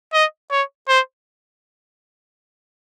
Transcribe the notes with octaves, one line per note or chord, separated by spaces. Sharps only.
D#5
C#5
C5